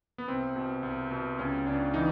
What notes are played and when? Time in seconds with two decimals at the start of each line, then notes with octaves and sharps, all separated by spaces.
0.18 B3
0.28 C2 C4
0.56 B2
0.83 C2
1.11 B2
1.39 C#2 C#4
1.66 C#2 D4
1.94 E3 D#4